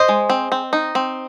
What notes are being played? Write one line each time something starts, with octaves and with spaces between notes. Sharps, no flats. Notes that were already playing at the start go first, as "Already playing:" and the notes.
Already playing: C5 D#5
G#3
C4
C4
D#4
C4